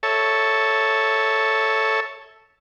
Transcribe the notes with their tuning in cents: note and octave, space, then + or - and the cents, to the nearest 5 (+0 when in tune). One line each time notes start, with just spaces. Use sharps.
A4 +0 C#5 +0 E5 -15